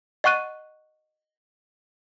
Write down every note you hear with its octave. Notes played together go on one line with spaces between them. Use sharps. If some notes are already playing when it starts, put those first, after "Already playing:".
D#5 F#5 C#6 F#6 D#7